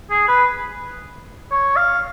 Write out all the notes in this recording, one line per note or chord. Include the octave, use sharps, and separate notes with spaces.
G#4
B4
C#5
F5